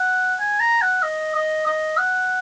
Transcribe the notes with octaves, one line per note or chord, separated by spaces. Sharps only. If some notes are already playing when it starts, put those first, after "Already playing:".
Already playing: F#5
G#5
A#5
F#5
D#5
D#5
D#5
F#5